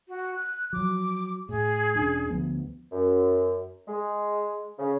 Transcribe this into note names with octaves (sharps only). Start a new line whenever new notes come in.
F#4
F#6
F3 F#3 D6
A2 G#4
E1 C#4 D4
D2 F3 B3
F#2
G#3
C#3